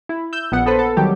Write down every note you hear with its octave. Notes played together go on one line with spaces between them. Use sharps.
E4
E6 G6
A#1 B3 F#5
B3 A4 B4 C5
A4
D#3 F#3 G3 G4